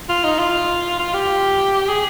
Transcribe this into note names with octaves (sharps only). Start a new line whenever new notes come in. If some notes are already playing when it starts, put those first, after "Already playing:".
F4
D#4
F4
F4
G4
G#4